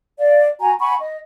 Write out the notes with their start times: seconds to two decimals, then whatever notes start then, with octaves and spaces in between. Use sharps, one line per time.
0.19 D5 F5
0.60 F#4 F#5 G#5 A#5
0.80 F#5 G#5 B5 C#6
1.00 D#5